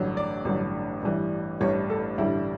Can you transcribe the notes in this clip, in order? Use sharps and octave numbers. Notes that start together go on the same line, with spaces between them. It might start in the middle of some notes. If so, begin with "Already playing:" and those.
Already playing: A1 G2 D3 F#3
D5
A1 G2 D3 F#3
A1 G2 E3 G3
A1 G2 E3 G3 C#5
A4
A1 G2 D3 G3 E4